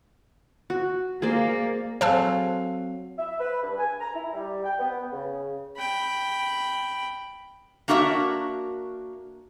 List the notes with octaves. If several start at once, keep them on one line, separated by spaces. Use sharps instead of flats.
F#4
A#3 G#4 C5 D5
F#3 C4 A4 C5 F5 G#5 A5 E6
E5
B4
G2
G#5
A#5
E4
G3
G5
B3
C#3
G5 B5
A#3 D4 F#4 A#4 E5